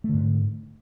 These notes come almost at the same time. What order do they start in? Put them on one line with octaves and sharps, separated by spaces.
A3 D3 G#2